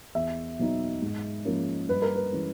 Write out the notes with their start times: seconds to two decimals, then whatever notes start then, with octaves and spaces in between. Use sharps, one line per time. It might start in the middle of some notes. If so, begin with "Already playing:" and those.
0.15 E2 E5
0.59 B2 F#3 B3 D#4
1.02 G#2
1.45 F3 A#3 C#4
1.89 G2 B4
2.02 A#4
2.16 B4
2.32 E3 G#3 C#4